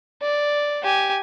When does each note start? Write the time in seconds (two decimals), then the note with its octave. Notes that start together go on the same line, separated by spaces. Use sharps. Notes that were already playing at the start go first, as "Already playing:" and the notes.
0.22 D5
0.83 G4 G#5